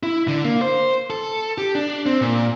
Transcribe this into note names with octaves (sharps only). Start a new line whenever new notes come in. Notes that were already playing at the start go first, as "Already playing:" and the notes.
E4
D3
A#3
C5
A4
G4
D4
C4
A#2